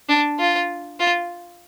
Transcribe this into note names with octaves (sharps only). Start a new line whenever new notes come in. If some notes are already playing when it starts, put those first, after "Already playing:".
D4
F4
F4